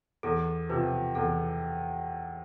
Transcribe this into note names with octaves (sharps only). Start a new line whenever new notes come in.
E2 A4
C3 F3 B4
E2 A4